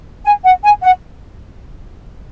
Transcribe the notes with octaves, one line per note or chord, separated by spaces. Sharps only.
G#5
F#5
G#5
F#5